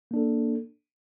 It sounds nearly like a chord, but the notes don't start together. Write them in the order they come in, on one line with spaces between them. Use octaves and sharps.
A#3 D4 A4